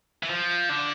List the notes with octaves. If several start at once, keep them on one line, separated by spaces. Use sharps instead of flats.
E3
F3
D3